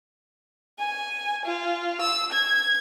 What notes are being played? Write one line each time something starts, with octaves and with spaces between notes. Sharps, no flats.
G#5
F4
E6
G#6